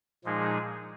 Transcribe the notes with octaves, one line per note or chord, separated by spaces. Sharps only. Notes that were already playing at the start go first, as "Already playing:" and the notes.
A#2 F3 G#3 D#4 G#4